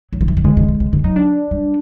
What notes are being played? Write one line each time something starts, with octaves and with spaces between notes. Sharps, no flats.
F#3
F3
E3
D#3
D3 G#3
C#3
D3
C#3
D3
F#3 D#4
D4
G3